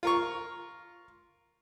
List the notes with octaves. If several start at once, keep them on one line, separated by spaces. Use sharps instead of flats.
F4 A#4 C#6